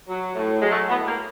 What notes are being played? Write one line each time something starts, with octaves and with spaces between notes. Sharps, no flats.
F#3
A2
F#3 G#3
A3
A2 B3
A#3